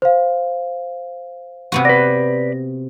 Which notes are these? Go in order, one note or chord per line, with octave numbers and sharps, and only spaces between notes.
C5 F5
C3 B3 F#4
B4 D5 A#6